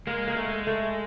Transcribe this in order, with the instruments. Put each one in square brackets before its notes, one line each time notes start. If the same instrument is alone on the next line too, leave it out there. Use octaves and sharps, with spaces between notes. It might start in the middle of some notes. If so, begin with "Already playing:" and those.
[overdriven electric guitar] G#3 [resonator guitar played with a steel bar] A#3
[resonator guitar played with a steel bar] A#3
A3
A3